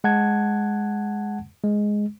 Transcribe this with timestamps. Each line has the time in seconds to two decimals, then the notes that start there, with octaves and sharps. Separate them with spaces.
0.04 G#3 F#5 A5 G#6
1.64 G#3